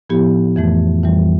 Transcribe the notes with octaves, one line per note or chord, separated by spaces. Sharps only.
A2 F3 B3 E4 G4
F2 E3 A3
F2 E3 G3